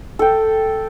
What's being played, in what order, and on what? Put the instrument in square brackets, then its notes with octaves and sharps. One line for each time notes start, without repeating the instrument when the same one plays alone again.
[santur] A4 G5